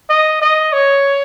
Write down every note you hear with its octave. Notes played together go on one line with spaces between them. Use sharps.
D#5
D#5
C#5